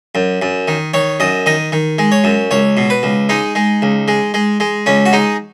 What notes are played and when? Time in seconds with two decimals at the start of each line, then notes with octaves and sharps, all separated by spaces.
0.15 F#2
0.42 F#2
0.68 D#3
0.94 D#3 C#5
1.20 F#2 D#5
1.46 D#3 D#5
1.72 D#3
1.98 G#3
2.12 C#5
2.24 F#2
2.51 C#2 C#5
2.77 B2
2.90 B4
3.03 C#2
3.29 G#3 D#4
3.55 G#3
3.82 C#2
4.08 G#3
4.34 G#3
4.60 G#3
4.86 C#2 C#4
5.06 F#4
5.13 G#3 D#4